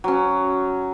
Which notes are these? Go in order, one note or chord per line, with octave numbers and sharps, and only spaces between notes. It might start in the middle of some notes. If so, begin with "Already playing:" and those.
F#3 C#4